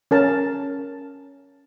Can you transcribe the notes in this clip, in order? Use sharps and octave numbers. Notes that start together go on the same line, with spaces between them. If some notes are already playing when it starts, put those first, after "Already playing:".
C#4 A#4 A5